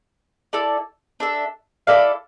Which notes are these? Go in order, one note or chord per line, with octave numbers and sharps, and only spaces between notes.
E4 A4 D5
D4 A4 E5
E4 A4 D5 F5